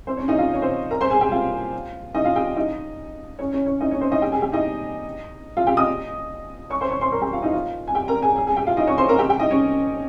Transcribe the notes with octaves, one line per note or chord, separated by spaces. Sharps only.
C4 C5
C#4 C#5
D#4 D#5
F4 F5
C#5
C4 C5
A#4 A#5
C5 C6
G#4 G#5
G4 G5
F4 F5
D#4 D#5
F4 F5
G4 G5
D#4 D#5
C#4 C#5
C#4 C#5
C#4 C#5
D#4 D#5
C#4 C#5
C4 C5
D#4 D#5
G4 G5
G#4 G#5
G4 G5
D#4 D#5
F4 F5
G4 G5
D#5 D#6
C#5 C#6
C5 C6
C#5 C#6
C5 C6
A#4 A#5
G4 G5
F4 F5
D#4 D#5
F4 F5
G#5
G4 G5
A#4 A#5
G#4 G#5
G#4 G#5
G#4 G#5
G4 G5
F4 F5
D#4 D#5
C#5 C#6
C5 C6
A#4 A#5
G4 G5
G4 G5
D#4 D#5
C#4 C#5